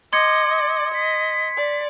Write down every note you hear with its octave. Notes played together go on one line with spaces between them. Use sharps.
D#5 C6 D6 G#6 C#7
D#5 B6
D5